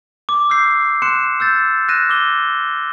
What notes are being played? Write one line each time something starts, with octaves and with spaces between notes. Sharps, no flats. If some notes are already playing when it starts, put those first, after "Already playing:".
D6
E6 F6 G6 C7
C6 F#6 C#7 E7
D6 E6 G6 A6
F6 F#6 A#6 D#7 E7
D6 E6 G7